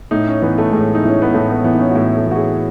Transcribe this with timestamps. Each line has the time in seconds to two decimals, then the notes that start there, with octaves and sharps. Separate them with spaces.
0.11 A2 D#4
0.27 C#4
0.42 E3 B3
0.58 A3
0.72 A2 G#3
0.95 D#4
1.04 E3 C#4
1.22 B3
1.34 A2 A3
1.49 B3
1.64 E3 B3
1.74 D#4
1.80 C#4
1.91 F#4
1.95 A2 E4
2.16 A4
2.26 E3
2.31 F#4
2.36 G#4